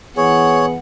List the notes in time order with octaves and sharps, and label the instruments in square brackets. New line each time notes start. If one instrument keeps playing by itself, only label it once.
[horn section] E3 B3 [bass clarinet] G#4 [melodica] C#5 [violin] F#5